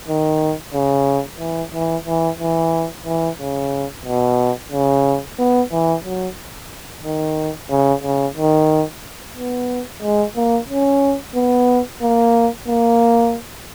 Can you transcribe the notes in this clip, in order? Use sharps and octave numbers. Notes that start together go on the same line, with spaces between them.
D#3
C#3
E3
E3
E3
E3
E3
C#3
B2
C#3
B3
E3
F#3
D#3
C#3
C#3
D#3
B3
G#3
A#3
C#4
B3
A#3
A#3